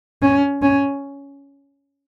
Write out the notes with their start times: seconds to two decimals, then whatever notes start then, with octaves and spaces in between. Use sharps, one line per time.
0.22 C#4
0.62 C#4